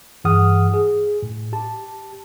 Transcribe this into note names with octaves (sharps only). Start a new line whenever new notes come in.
G2 E3 G#4 F#5 D#6 F6
G#4
A2
G4 A5